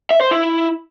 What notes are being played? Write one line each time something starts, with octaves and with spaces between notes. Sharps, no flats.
E5
C5
E4